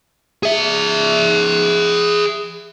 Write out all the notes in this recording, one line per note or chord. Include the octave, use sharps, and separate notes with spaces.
G#4 E5